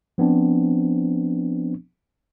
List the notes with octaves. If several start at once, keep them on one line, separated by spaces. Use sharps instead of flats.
F3 B3 C4 D4